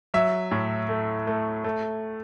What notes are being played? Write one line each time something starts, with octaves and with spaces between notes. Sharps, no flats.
F#3 E5
A2
A3
A3
A3